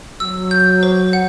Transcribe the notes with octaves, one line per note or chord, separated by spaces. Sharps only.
F#3 E6
G6
C5
F#5